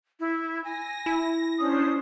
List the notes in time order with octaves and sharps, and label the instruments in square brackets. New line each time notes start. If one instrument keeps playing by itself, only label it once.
[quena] E4
[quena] G#5 [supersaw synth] A#6
[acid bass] E4
[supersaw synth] C#4 D4 C5 [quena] D#6